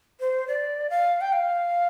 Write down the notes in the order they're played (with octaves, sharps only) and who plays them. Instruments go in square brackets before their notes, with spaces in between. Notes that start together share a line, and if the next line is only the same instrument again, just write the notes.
[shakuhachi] C5
D5
F5
G5
F5